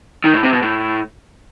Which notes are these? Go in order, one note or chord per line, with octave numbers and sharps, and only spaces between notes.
D#3
A2
C3
B2
A2